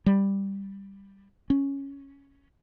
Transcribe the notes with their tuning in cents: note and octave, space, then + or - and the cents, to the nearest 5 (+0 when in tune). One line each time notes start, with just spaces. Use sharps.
G3 +5
C#4 +0